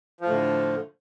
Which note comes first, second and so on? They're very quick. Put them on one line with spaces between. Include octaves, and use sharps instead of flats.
F3 A2 D3